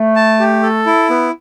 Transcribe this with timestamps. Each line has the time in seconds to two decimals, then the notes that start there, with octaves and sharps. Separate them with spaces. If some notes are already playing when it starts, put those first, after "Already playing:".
Already playing: A3
0.16 A5
0.40 G4
0.62 A4
0.86 E4
1.10 B3